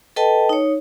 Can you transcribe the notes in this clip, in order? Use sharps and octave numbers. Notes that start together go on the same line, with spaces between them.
A4 B4 D#5 G5 A5
D#4 C#5